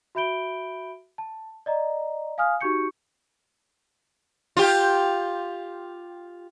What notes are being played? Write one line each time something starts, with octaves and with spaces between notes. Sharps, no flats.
F#4 E5 B5 G6 D7 G7
A5
D5 D#5 A#5
F5 G#5 D#6 F6
D#4 F#4 G4 C#6 G6 C#7
F4 G4